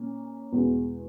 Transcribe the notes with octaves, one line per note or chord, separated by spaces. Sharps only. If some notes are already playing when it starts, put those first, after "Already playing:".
Already playing: A#2 A#3 C#4
E2 B2 G#3 B3